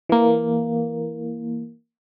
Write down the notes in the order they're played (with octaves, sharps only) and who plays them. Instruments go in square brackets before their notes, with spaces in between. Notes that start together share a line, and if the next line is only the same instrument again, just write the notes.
[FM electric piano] E3 A#3